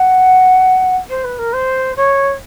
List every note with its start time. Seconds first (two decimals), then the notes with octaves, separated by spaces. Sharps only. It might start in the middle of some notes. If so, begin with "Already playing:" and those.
Already playing: F#5
1.10 C5
1.24 B4
1.38 A#4
1.53 C5
1.96 C#5